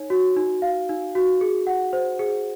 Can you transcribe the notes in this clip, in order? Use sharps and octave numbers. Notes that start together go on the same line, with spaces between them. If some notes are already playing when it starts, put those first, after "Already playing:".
Already playing: D#4 C#5
F#4
D#4
F5
D#4
F#4
G#4
F#5
C5
G#4